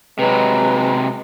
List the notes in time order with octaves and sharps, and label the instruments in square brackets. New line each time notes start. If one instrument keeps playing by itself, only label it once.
[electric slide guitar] C3 F#3 [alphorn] G#3 [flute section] B4 A#5